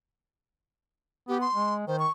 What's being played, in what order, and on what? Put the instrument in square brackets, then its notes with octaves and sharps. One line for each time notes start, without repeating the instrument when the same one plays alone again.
[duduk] B3 [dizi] G4
[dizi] C6
[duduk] G#3
[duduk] D#3 [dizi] C5
[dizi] C#6